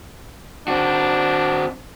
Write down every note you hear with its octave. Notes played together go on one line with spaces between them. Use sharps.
C4 D4 F#4